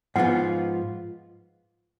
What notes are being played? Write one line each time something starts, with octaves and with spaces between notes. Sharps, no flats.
G#2 F3 B3 F4 F#5